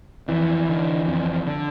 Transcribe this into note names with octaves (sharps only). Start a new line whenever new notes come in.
F2 E3
D3
F2
D3